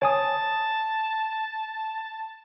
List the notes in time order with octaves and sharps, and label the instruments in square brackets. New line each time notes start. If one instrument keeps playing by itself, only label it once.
[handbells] C#5 G#5 D#6 [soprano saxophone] A5